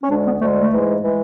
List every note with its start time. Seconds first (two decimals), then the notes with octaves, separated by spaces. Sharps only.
0.03 C#4
0.10 D2 D3 G#3 D4
0.26 B3
0.40 D2 D3 G#3 A3
0.56 A3
0.71 G#2 E3 G#3
1.02 E3 G#3